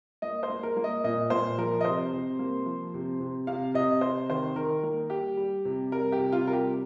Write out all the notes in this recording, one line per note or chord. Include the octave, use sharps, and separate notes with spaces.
A#3 D#5
C5
A#3
A#4
A#3
D#5
A#2 D#5
A#2 C5
F3 A#4
D#5
C3 C5
C3
A#3
F3
C3
C3
C3 F5
C3 D#5
C3 C5
D#3 C5
D#3 A#4
A#3 A#4
G3 G4
G3
C3
G3 A#4
G4
C3
F4
G3 A#4
G4